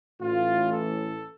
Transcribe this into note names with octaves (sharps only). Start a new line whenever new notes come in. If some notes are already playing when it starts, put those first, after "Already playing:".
A1 A2 E3 F4
A4